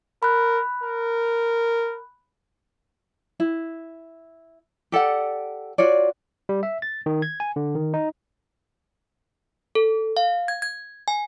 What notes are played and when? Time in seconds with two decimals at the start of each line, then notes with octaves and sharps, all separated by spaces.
0.23 A#4 B5 F#6
0.83 A#4
3.40 E4
4.92 G4 A4 D5 F#5
5.78 F4 F#4 C#5 D5
6.49 G3
6.63 E5
6.82 A6
7.06 D#3
7.22 G#6
7.40 G#5
7.56 D3
7.75 D#3
7.94 D#4
9.75 A4
10.17 F5
10.48 G#6
10.62 G#6
11.08 G#5